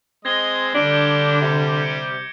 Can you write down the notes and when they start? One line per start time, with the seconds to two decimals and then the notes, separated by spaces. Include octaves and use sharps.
0.25 G#3 C4 D#5 G#6 A#6 G7
0.74 D3 G3 D4
0.91 D6 G6
1.41 C3
1.81 G6 C#7 D7